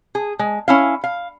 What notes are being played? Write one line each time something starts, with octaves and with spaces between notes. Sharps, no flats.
G#4
G#3
C#4 E4 F5
F5